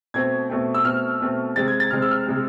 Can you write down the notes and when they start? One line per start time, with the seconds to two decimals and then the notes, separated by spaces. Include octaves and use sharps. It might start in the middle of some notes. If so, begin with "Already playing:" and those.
0.14 B2 A3 C4 G#6
0.50 B2 A3 C4
0.74 E6
0.84 B2 A3 C4 F6
1.21 B2 A3 C4
1.56 C3 G#3 C4 A6
1.68 G#6
1.80 A6
1.91 C3 G#3 C4 F6
2.02 E6
2.11 F6
2.26 C3 G#3 C4